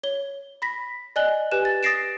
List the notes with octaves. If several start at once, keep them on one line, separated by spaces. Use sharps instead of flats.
C#5 G7
B5 A#6 B6
D5 D#5 G#5 F#6 F#7 G7
G4 B4 G#5 F#6 E7
A6
D#6 A6 A#6 C7 D7 E7